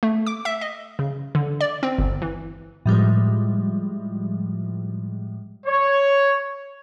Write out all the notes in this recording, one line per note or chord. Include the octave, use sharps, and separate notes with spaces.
A3
D6
E5
D#5
C#3
D3
D5
C4
G1
E3
A2 F3 G3 G#3
C#5